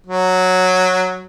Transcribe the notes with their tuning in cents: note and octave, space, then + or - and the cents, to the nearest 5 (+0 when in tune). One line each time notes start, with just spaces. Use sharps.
F#3 -5